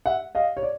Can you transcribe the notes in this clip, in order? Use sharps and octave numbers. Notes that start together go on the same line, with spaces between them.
E5 F#5
D#5 F5
C#5
D5